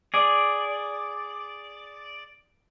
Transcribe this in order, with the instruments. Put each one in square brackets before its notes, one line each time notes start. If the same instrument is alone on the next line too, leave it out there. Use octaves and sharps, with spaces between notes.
[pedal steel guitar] G#4 D5